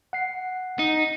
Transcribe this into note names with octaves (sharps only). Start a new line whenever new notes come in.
F#5 C7
D#4